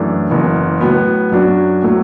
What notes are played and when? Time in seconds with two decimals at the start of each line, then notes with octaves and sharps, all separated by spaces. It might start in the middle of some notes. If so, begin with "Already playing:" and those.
Already playing: F#2 E3 A3 D4
0.30 F#1 F#2 E3 B3
0.81 A2 F#3 B3
1.32 F#2 F#3 D4 F#4
1.82 A2 F#3 A3